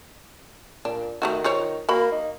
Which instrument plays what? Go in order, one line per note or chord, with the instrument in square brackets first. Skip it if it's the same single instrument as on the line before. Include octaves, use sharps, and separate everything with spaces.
[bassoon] A#2 [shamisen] D4
[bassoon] D#3 [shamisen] A3 D#4 F#4
[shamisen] F4 C5 C#5
[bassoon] A#3 [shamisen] F#4 B5
[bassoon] D#4